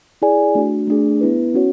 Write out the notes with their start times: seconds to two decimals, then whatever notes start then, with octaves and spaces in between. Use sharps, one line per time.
0.22 E4 G#4 D5 G#5
0.55 A3 D4 F#4
0.87 A3 D4 G#4
1.21 B3 E4 B4
1.54 C#4 F#4 C#5